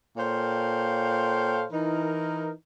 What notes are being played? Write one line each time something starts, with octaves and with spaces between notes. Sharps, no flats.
A#2 A4 C5 C#5 F5 G5
E3 D#4 A#4